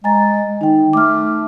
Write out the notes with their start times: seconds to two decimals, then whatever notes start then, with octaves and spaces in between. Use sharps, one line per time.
0.04 G#3 G#5 A#5 A6
0.61 D#3 D#4 G5
0.93 A3 D6 F6